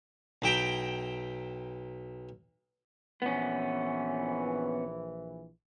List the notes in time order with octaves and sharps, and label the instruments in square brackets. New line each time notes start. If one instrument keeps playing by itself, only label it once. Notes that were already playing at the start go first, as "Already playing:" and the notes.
[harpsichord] B1 E4 G5 A#5
[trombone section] A#1 E3 [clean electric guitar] B3 C#4